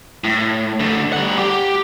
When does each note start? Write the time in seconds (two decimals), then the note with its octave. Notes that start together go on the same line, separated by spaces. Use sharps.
0.24 A2
0.80 D3 A3
1.13 G3 F#5
1.39 G4